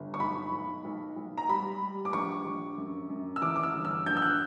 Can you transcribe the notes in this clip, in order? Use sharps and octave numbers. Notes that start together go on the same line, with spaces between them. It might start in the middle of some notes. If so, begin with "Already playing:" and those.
Already playing: G1
C#6
B1 B5
B1
B1
B1
A#5
G3 B5
G3
D6
A#1 C#6
A#1
F#2
F#2
E6
E3 D6
D6
E6
G1
E6
A#1 G6
E6
F#6